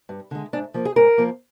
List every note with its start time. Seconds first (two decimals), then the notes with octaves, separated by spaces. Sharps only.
0.09 G2
0.31 D3 G#3
0.53 G#2 D4
0.74 F3 A#3
0.85 G#4
0.96 G#2 A#4
1.18 F3 A#3